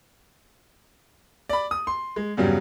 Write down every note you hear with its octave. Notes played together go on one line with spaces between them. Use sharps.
D5 B5
D#6
C6
G#3
E2 G2 C#3 F#3 G3